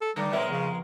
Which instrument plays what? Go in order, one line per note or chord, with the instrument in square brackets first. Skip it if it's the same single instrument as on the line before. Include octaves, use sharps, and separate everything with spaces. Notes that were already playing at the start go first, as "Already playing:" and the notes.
[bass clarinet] A4
[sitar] D3 A3 [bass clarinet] G3
[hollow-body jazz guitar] B1 C#5 E5 [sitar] G#3 B3 A#4
[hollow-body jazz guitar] F2 [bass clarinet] C#3